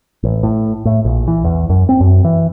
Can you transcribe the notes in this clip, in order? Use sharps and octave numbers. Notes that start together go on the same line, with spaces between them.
A1
A2
A2
A#1
E3
E2
F#2
C4
F#2
E3